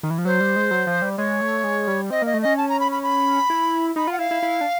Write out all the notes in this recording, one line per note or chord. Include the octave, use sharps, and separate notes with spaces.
D#3
E3
F3
F#3 C5
G3
G#3
F#3
F3
G3
G#3 C#5
A3
G#3
G3
C4 D#5
A#3 D#5
A3
C#4 D#5
A5
A#5
B5
B5
B5
E4
D#4 B5
F4 F#5
E4 F5
E4
E4
D4